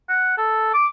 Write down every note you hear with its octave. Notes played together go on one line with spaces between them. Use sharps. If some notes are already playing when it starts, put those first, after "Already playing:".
F#5
A4
D6